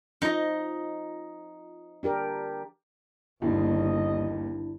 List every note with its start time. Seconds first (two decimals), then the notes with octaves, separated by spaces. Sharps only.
0.22 F3 D#4 D#5
2.03 D4 G4 A#4
3.42 G1 D#2 D4 E4 D#5